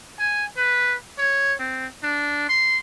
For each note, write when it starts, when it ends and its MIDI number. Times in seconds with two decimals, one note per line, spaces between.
0.19 0.45 80
0.57 0.95 71
1.19 1.55 73
1.60 1.87 60
2.03 2.47 62
2.49 2.78 84